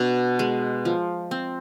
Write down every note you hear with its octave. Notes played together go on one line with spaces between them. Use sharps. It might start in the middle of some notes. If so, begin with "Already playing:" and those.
Already playing: B2 D4
G#3
F3
C4